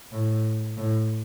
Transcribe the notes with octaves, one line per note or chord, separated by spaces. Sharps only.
A2
A2